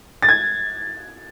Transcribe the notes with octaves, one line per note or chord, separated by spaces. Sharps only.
A6
G#6